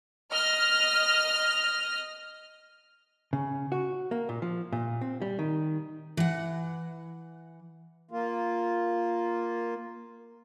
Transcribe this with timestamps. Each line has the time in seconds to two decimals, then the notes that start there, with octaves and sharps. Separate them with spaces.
0.30 D#5 F6
3.33 C#3
3.72 F#4
4.11 A#3
4.29 A#2
4.42 F3
4.72 A#2
5.01 C4
5.22 G3
5.39 D#3
6.17 E3 F#5
8.11 A#3 F4